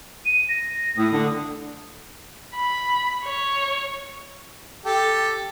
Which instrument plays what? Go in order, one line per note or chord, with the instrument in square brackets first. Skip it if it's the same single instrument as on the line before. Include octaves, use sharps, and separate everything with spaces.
[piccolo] D#7
A#6
[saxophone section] A2 [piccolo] D#6
[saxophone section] D3
[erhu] B5
C#5
[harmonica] G4 A4